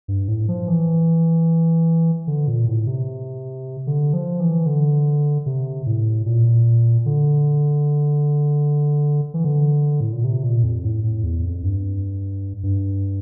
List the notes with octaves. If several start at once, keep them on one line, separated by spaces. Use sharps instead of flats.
G2
A2
F3
E3
D3
A#2
A2
C3
D3
F3
E3
D3
C3
A2
A#2
D3
E3
D3
A2
A#2
C3
A#2
F2
A2
A2
E2
F2
G2
G2